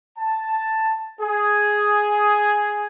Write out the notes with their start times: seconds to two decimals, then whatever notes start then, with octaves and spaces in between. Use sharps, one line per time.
0.18 A5
1.21 G#4